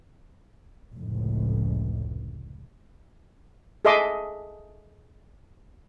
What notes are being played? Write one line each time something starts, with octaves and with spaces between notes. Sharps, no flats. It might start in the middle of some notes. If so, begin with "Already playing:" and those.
F1 C#2 A2
G#4 A4 D#5 E5 C6 D6